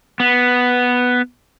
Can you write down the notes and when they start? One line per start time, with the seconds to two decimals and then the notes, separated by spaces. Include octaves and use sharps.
0.20 B3